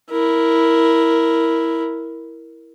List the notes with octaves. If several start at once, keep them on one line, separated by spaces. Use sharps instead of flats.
E4 A#4